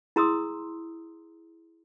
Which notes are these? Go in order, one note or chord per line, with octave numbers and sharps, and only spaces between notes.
E4 G#4 A#5 C6 D#6 E6